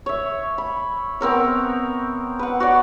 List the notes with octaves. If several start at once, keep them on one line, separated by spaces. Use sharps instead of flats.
C#5 E5
B5
B3 C4 A#4 C#5
B4 F#5
F#4 C#5 D5